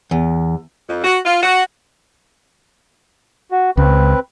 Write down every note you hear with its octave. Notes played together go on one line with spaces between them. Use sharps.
E2
F2
F#4
F4
F#4
F#4
C#2 C4 B4